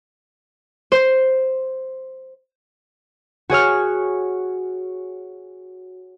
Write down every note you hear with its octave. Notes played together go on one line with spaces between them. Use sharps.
C5
F#4 G#4 C#5 F6